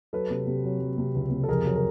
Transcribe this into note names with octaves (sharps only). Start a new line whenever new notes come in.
F#3 A4 B4
C3
C3
F#3
F#3
C3
C#2
C3
A4
F2 G#4 A#4
F#3
A#4